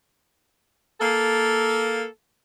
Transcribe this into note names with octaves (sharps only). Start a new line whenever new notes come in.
A#3 A4